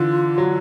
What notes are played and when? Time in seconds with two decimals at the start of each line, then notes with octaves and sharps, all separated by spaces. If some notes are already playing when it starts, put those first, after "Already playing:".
Already playing: D3 E3 F4
0.38 F#3